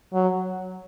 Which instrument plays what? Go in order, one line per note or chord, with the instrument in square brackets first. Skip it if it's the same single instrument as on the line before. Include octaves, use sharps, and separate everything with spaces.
[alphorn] F#3